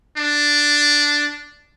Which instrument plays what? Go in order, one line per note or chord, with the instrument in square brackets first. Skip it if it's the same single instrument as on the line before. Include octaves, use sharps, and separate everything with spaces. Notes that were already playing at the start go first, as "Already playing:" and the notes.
[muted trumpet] D4